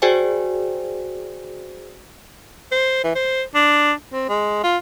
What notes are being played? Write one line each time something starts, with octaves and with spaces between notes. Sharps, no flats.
F#4 G#4 C5 D5 G5 G#5
C5
E3
C5
D4
C4
G#3
F4